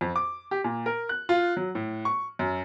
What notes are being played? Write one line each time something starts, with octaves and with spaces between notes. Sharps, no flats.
F2
D6
G4
A#2
A#4
F#6
F4
F#3
A2
C#6
F#2